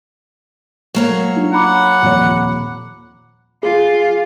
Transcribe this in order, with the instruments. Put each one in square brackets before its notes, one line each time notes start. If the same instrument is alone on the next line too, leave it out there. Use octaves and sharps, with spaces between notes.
[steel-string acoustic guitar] F#3 A#3 C#5 [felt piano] A3
[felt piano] D4
[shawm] F#5 [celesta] A#5 B5 D6
[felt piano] D#1 F2 C#5
[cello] F4 [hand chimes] G#4